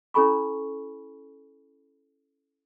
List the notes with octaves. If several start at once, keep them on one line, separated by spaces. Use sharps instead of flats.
C#4 E4 A4 G#5 B5 C#6